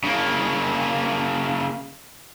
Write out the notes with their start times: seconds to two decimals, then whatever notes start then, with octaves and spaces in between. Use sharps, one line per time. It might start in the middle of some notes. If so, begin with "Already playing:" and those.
0.04 C#3 A#3